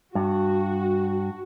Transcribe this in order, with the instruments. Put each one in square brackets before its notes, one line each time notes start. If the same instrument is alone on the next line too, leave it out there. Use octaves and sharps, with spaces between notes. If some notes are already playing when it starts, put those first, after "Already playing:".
[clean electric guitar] G2 [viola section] F#4